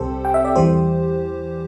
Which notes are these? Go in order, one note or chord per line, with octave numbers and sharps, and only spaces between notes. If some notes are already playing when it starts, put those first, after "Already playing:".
Already playing: C2 C3 G3 C4 G4 A4 C5
G5
E5
D5
E2 E3 G3 G4 C5